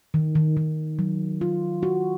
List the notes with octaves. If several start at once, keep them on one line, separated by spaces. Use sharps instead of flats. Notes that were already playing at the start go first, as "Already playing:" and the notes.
D#3
D#3
D#3
F#3
F4
F#4